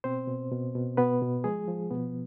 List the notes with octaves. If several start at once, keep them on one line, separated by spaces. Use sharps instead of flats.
B2 C4 C5
B2
B2
B2
B2 B3 B4
B2
F3 G#3 G#4
F3
B2 B3